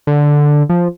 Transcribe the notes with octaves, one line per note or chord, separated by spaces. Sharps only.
D3
F3